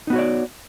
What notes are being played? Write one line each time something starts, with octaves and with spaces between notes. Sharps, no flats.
B3 D#4 F#4 C#5 D5